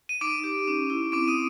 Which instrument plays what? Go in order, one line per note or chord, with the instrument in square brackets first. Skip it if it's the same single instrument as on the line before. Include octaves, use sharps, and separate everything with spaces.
[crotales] D#7
[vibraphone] D#4 [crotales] D6 D7
[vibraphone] G4
C#4
E4
[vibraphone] C4 [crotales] D6 D7
[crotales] D#6 D#7